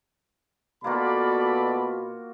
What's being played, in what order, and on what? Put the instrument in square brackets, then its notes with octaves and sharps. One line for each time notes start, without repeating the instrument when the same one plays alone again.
[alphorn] B2 [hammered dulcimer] A#3 F4 F#4 [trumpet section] A4 D5 B5